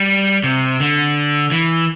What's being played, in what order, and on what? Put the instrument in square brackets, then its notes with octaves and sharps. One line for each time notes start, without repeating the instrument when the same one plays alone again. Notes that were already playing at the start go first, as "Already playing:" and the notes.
Already playing: [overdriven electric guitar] G3
C3
D3
E3